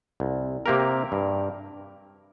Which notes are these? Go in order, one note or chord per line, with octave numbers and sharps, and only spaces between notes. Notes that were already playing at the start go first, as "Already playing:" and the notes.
C2
C3 A#3 G4 A#4
G2